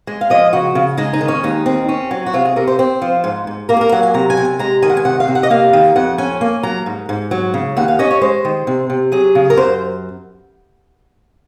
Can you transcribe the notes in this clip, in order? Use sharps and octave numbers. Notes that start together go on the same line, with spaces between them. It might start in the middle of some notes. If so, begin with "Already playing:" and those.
G#3
F5
F3 D#5
C#3 F#4
C#3
G#3 D#4
D#4
D#3
C#4
D#2 D#4
C4
C#4
F#3
F#4
C3 F4
G#4
C3 A#4
C5
C4 C5
F3
G#2
G#2
A#3 A#4
G#4
A#4
F#3 F#5
G#5
C3 A#5
G#5
C3
G#5
G#3 A#5
D#3 G#5
F#5
G#5
C3 F#5
F5
C3
F#5
D#5
A#3 F5
D#3
F2 F#5
C#4 G#5
A#3 G#5
F#3 A#5
G#2
G#2
F#3
C#3
D#2 F#5
F5
C#4 D#5
C#5
G#3 C5
D#3
C3
C3
F#3 G#4
C#3
A#4
F#2 C5